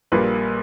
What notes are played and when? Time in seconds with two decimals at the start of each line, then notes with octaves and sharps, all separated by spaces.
0.12 A#1 A#2 G3 A#3 B4